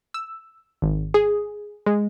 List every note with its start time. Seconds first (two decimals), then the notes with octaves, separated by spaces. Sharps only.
0.14 E6
0.82 G#1
1.14 G#4
1.86 G#3